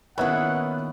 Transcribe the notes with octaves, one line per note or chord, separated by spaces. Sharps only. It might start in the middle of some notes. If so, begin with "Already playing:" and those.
A#2 D#3 B3 C#4 E4 G#4 B4 F#5